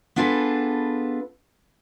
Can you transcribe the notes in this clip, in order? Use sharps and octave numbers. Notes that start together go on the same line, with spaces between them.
B3 D4 F4 G#4 A4 B4